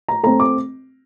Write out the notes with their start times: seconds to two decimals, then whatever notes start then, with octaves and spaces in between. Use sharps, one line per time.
0.08 A#5
0.23 A3 C4 A#5
0.40 D6